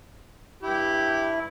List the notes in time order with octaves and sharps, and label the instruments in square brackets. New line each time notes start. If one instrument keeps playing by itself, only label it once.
[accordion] G2 E4 [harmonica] G4